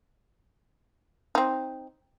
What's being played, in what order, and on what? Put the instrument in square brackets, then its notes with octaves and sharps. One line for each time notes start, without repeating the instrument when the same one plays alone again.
[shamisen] C4 D#4